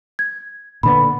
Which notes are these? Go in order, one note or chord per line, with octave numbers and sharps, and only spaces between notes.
G#6
A#2 D3 B3 B5